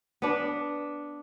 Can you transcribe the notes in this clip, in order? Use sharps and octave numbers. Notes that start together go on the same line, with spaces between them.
B3 D4